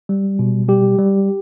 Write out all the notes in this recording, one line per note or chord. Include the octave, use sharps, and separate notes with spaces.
G3
B2
G3 G4
G3